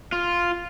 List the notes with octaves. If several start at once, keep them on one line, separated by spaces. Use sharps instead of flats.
F4